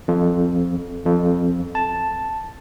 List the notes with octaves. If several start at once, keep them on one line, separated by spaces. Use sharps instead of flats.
F2
F2
A5